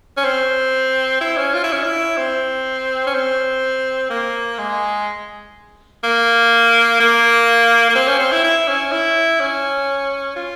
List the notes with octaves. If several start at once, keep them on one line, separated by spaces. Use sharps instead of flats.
C#4
C4
E4
C#4
F4
E4
C#4
E4
C4
C#4
C4
A#3
G#3
A#3
A#3
A#3
C4
C#4
C4
E4
E4
C#4
E4
C#4
F4